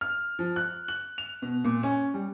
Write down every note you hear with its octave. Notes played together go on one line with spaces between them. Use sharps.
F6
F3
F#6
F#7
F7
B2
A#2
C#4
G3